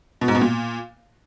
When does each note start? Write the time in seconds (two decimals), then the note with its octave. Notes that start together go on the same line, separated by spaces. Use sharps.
0.21 B2
0.28 G#2
0.35 B2
0.41 A#2